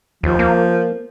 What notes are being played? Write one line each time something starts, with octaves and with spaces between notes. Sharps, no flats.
D#2 F3
A#3